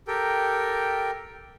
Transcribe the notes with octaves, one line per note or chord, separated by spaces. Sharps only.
G4 A4 A#4 G5